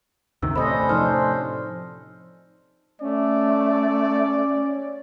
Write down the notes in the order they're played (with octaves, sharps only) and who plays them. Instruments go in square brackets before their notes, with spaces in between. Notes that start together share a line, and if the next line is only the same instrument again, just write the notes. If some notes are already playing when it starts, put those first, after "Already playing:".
[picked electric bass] D2 C3 D#3 [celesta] E6
[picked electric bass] A2 C3 [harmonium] C#4 D4 A4 [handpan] C5 D#5 [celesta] B5
[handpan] F3 D#4 C5 [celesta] F6
[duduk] A3 [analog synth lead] C#4 [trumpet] D5